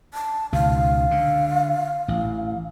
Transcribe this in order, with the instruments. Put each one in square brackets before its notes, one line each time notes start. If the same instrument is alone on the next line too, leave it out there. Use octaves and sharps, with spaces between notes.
[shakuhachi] A5
[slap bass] C#2 B2 D#3 [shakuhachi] F5
[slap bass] D3
A1